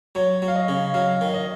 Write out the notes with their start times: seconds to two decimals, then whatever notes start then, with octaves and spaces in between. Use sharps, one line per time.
0.15 F#3 C#5
0.42 F#3
0.48 F5
0.55 D#5
0.68 C#3
0.94 F#3 F5
1.21 D#3
1.28 F5
1.34 D#5